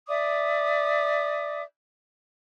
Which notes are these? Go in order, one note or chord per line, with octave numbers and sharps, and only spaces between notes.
D5 E5 D6 D#6